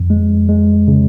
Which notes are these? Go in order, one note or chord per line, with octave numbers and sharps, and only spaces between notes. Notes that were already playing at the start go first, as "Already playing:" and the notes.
Already playing: F2
G#3
G#3
C#3